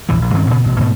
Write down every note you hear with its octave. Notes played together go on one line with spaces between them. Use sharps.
A#1 E2 E3
A#1
G2 D#3 C4 C#4
A#2 C#3 B3
A1 B2
G#2 B2 A3